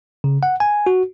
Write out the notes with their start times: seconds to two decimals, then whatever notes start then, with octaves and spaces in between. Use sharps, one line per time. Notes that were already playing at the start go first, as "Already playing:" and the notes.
0.24 C#3
0.43 F#5
0.60 G#5
0.87 F#4